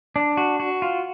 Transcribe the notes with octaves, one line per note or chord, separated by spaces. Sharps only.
D4
F#4
F#4
F4